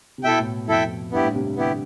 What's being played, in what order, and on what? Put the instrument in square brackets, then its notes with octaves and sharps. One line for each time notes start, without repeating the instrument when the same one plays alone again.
[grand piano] C3
[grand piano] B2 [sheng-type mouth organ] E4 A4 E5 G5
[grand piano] A2
[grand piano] F2 [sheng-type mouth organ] E4 A4 E5 G5
[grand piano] G2 [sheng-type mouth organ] B3 E4 G4
[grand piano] A2
C3
[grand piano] D3 [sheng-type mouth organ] B3 E4 G4